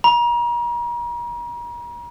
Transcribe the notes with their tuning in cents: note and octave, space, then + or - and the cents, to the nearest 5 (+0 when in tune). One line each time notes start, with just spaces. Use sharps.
A#5 +40